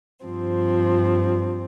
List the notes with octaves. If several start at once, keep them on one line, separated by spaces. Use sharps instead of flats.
G2 F3 C4